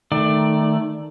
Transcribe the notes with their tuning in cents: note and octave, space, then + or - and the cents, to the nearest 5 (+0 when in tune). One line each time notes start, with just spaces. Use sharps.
D#3 +0 A3 +0 D5 +15